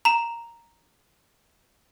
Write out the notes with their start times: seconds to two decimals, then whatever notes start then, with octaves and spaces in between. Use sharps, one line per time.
0.05 A#5 E7